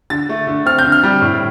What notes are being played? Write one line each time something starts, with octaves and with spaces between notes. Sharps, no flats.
D3 A6
A3
D3
C4 F6
G6
D3
F6
G3
A2